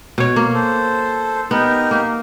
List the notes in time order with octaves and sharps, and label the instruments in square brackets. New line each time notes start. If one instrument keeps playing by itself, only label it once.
[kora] B2 C#5
A#3
[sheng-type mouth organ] A4 C5
[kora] B3 [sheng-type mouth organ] D#4 G4 A#4
[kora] A#3